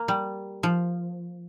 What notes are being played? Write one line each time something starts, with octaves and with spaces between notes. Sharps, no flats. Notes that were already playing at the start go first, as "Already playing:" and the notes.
Already playing: A#3
G3
F3